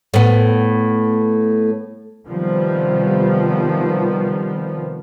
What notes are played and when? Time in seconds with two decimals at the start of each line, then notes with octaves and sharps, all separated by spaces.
0.14 A2 B3
2.27 C3 D#3 F3 G3 B3